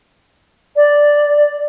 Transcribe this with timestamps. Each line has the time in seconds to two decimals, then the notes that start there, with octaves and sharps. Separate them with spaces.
0.76 D5